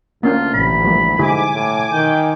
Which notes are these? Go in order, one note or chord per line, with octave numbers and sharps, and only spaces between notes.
D2 A#3 C#4 D4 F4
A1 B5
F3 G3 A#3
G#2 D3 E4 G4 G#5 D6
A2
D#3 G5